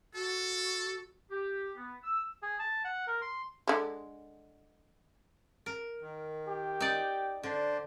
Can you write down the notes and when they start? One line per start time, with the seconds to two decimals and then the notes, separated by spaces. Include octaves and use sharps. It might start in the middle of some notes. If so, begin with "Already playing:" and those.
0.15 F#4 A4
1.30 G4
1.76 B3
2.04 E6
2.42 G#4
2.59 A5
2.84 F#5
3.07 A#4
3.22 C6
3.67 D3 G#3
5.66 A#4
6.01 D#3
6.48 G4
6.80 D#4 D5
7.43 D3 D4 C5